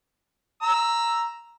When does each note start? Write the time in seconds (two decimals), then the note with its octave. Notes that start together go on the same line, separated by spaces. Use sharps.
0.63 A#5 E6